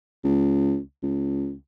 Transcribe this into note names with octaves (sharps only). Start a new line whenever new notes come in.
C#2
C#2